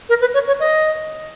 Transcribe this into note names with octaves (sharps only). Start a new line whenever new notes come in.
A#4
B4
C#5
C#5
D#5